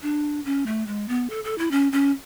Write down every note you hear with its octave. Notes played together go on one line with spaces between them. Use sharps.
D4
C#4
A3
G#3
B3
A4
A4
E4
C#4
C#4